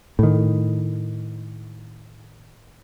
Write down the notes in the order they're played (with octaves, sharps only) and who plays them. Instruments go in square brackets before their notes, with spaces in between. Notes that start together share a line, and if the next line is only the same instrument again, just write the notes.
[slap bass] A2 D#3